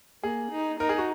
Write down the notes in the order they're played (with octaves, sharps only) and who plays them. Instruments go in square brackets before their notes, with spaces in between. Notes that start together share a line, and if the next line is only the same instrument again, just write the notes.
[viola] A#3 [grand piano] G#4
[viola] D#4
[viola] D#4 [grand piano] A#4
[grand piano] G#4
F#4